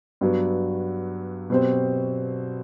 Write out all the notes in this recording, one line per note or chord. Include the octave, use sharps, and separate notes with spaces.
G2 F#3 B3
B2 F#3 C4 G4 C5